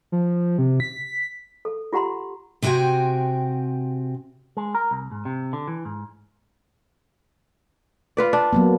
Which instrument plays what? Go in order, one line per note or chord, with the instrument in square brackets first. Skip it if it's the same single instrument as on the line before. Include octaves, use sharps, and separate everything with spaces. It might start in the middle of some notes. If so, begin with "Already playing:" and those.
[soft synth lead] F3
C3
B6
[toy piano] A4
F4 G4 F#5 A#5 C6
[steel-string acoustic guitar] C3 C4 F#4 G5 G#5
[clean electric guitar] G#3
A#4
C2
G#2
C3
D3
E3
G#2
[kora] F4 B4 D5
D4
[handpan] F#3 A#3 B3